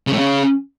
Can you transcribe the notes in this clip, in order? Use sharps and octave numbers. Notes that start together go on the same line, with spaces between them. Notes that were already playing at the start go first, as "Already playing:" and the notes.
C#3
A2
C#3